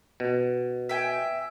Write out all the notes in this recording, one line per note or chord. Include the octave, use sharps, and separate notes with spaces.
B2
E5 G5 G#5